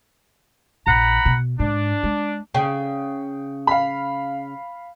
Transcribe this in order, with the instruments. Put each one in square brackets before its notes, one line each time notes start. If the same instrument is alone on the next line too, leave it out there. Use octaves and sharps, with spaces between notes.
[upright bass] A#1 [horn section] F#5 A#5 B5
[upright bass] B2
[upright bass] G#2 [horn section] D4
[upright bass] G#3
[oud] C#3 [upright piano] G5
[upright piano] F5 B5